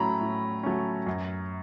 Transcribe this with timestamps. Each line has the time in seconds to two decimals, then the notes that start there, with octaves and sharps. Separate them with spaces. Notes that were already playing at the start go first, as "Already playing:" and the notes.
Already playing: A2 F#3 A3 C#4 A#5 B5
0.21 A2
0.63 F#3 A3 C#4
1.06 F#2